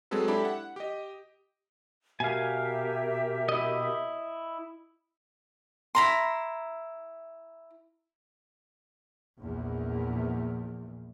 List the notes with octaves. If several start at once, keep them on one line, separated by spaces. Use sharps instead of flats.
F#3 G#3 C4 G#4 A4 B4
D4 E4 G4 A4 B5
F#5
G4 D#5
B2 G4 A#4 E5 F5 G#5
E4 D#5
E4 A#5 C6
A#1 E2